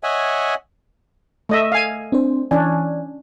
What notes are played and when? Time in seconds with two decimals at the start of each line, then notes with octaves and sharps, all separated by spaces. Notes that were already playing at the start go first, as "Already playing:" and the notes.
0.03 C#5 D#5 E5 F#5 G#5
1.49 A3 D#5 E5
1.72 F5 G#5
2.12 C4 D4 C5
2.51 E3 C#4 D4 D5 G#5